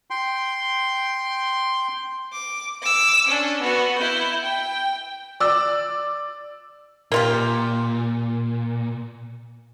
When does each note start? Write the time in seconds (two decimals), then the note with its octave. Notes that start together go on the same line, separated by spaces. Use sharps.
0.10 G5 C6
2.33 D6
2.82 D6 E6
3.27 C#4 D4
3.62 B3 F#4
3.98 E4 G6
4.43 G5
5.40 D5 E6
7.12 A#2 A#3 F4 G4